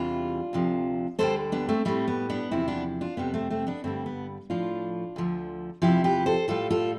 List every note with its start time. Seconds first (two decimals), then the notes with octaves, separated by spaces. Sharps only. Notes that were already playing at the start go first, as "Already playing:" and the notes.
Already playing: E2 C3 E3 G3 D4 F4
0.53 D2 C3 F3
1.19 D2 D3 G3 A4 C5
1.52 B3 D4
1.69 A3 C4
1.85 A2 G3 A3 C4
2.07 B3
2.30 B3 D4
2.51 E2 C3 F3 C4 E4
2.68 B3 D4
3.01 D4 F4
3.17 F2 C3 G3 B3
3.34 A3 C4
3.50 A3 C4
3.67 B3 D4
3.84 G2 D3 G3 A3 C4
4.06 B3
4.50 A2 F3 D4 F4
5.16 D2 D3 F3
5.82 E2 C3 F3 E4 G4
6.04 G4 B4
6.26 A4 C5
6.48 A2 G3 F4 A4
6.70 F4 A4